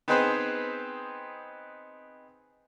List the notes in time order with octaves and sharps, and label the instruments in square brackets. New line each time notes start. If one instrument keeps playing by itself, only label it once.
[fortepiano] B3 C4 D#4 G#4 B4 C5